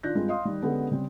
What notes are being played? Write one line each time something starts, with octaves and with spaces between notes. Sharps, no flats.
D#3 D4 F4 F#6 G6 A#6
G2 G#3 C4 F4
D#5 F5 C6 D#6
D#3 G3
D3 G#3 B3 C#4 G4 A4
C#3 G3 C4